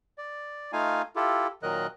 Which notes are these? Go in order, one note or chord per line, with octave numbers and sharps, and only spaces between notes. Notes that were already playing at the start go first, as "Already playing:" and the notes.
D5
A3 D#4 F4 F5 G#5
E4 F4 G4 A4
A#2 D#3 F#3 A#4 D#5 F#6